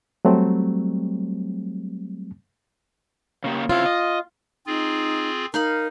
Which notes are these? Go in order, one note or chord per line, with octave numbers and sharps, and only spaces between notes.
F#3 G3 A3 C4
C#3 A#3 G4
C#3 C4 E4 F4
D#5
C4 D#4 F4 G#4
D#4 A#4 F5 B5